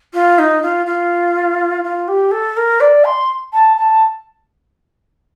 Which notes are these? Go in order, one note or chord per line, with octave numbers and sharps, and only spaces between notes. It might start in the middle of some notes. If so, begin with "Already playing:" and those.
F4
D#4
F4
F4
F4
G4
A4
A#4
D5
C6
A5
A5